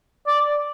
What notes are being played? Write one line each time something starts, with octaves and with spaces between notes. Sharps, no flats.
D5